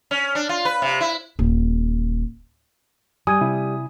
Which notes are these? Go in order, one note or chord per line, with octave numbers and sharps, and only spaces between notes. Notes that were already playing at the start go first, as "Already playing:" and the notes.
C#4
D4
F4
B4
C3
E4
D#1
G3 G#5 D#6 G#6 D#7
C3 E4